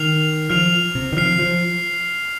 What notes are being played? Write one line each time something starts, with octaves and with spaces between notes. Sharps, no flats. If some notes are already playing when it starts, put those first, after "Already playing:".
Already playing: D#3 F6 C7 F7
F3 F6 C7 F7
C3
D#3
F3 F6 C7 F7
F3